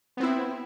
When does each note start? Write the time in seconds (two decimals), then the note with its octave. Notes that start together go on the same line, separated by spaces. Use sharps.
0.17 B3
0.20 C4
0.23 E4